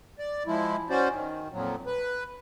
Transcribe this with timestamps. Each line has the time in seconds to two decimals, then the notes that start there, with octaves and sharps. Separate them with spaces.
0.19 D5
0.47 F3 G#3 E4
0.90 C#4 F#4 C5 D5
1.10 D#3
1.52 F2 A#2 F#3
1.86 B4